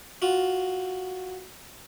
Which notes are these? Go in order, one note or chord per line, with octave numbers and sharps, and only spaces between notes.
F4 F#4